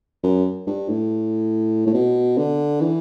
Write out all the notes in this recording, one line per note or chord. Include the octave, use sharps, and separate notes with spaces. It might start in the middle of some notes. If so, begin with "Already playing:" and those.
F#2
G2
A2
A2
B2
D3
E3